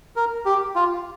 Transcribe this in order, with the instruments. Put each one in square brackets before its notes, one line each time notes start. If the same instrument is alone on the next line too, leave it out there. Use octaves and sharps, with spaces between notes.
[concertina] A#4
G4
F4